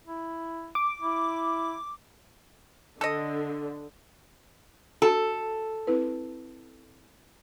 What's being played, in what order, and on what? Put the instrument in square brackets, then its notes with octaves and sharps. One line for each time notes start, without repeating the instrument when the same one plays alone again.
[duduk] E4
[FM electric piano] D6
[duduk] E4
[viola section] D3 [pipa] A4 D#5
[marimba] F#4 [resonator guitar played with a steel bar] A4
[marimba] C4 E4 B4